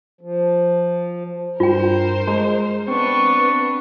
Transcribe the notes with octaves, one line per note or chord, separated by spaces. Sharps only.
F3
G2 F4 A#4 C5 G5
G#3 A#5
B3 C4 D4 B4 C#6